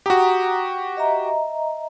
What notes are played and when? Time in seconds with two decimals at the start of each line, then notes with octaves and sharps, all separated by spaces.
0.06 F#4 G4 F#5 A#5 D#6
0.97 D#5 E5 A#5